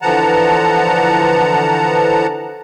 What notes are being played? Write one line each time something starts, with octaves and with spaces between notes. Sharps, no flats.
D3 E3 F3 F#5 A5 A#5